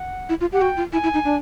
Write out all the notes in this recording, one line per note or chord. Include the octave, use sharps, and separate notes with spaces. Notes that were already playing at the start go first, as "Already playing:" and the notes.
Already playing: F#5
E4
F4
G4 F#5
F#4 G5
F4
E4 G#5
E4
D#4
D4